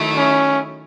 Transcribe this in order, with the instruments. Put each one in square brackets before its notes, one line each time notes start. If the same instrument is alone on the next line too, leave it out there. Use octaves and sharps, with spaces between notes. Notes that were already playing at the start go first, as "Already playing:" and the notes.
Already playing: [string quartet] D#3 F#3 A3 E4
[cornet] C#4